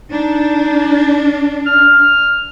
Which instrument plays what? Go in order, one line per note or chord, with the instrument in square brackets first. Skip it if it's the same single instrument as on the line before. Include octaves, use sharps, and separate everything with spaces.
[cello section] D4 [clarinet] D#4
[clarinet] F6